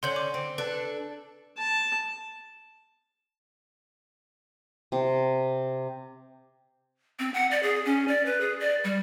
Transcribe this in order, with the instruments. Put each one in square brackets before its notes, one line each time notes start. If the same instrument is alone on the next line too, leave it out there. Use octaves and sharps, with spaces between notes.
[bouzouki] D3 C#4 [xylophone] C6 G6 F#7
[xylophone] D6
[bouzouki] C4
[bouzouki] D4 A4 [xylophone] B4
[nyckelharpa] A5
[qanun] C3
[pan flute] C4
F#5
D5
G#4
C#4
D5
B4
G#4
D5
G3